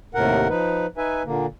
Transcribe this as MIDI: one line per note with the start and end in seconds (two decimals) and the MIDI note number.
0.14 0.48 39
0.14 0.48 45
0.14 0.48 48
0.14 0.48 70
0.14 0.48 78
0.49 0.86 53
0.49 0.86 63
0.49 0.86 71
0.97 1.23 63
0.97 1.23 71
0.97 1.23 76
0.97 1.23 80
1.26 1.46 46
1.26 1.46 50
1.26 1.46 58